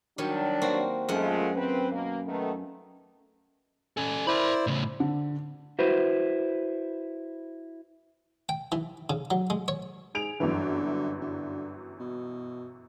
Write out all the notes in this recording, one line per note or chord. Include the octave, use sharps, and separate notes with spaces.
D#3 F#3 G3 D4 C#5
A#3 C4 F#4
F#2 G#3 A3 F4 F#5
C4 B4
B2 A#3
D#3 A3 B3
C#4 A4 G#5
E4 A#4 C5 D5 B5
A2 C#3
D3
E4 F#4 B4 C5
G5
E3
C#3
F#3
G#3
C#5
G#2 G#4 D7 F7
G1 F#2 D3 E3
D3
B2